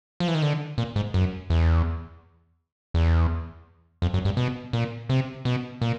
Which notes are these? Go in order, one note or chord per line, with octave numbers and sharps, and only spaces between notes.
F3
E3
D#3
D3
A#2
G#2
F#2
E2
E2
F2
F#2
G2
B2
A#2
C3
B2
A#2